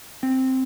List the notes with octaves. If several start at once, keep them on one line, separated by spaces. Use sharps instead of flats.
C4